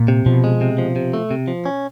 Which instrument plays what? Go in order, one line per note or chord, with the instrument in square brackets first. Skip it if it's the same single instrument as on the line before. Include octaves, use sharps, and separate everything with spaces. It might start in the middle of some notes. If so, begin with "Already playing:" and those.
Already playing: [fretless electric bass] A#2
[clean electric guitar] C3
[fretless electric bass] B2 [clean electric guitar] F3
[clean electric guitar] G#3
C3
F3
C3
A3
C3
F3
C#4